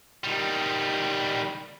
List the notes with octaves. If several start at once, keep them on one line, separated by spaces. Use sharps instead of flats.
D#3 G3